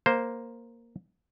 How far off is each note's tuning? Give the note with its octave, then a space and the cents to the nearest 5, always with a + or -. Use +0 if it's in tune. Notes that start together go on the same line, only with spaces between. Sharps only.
A#3 +0 C5 +0